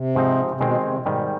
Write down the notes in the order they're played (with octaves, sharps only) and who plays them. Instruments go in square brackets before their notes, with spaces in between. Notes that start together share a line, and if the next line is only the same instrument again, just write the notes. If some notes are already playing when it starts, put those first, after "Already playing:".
Already playing: [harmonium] C3
[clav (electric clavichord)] G#2 F3 C4 D#4
[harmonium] C3
[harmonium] B2 [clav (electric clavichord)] D#3 G#3 C4
[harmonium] C3
[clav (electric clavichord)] G#2 D#3 G3 [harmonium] B2